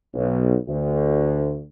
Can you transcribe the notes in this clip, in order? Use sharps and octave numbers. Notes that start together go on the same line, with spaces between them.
B1
D2